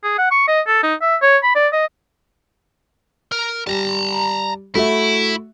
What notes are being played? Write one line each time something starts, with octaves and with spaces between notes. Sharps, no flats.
G#4
F#5
C#6
D#5
A4
D#4
E5
C#5
B5
D5
D#5
A#4
G3 A5 A#5
A3 E4 F#4 E5